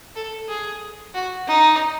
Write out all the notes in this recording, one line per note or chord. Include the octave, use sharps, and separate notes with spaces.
A4
G#4
F#4
D#4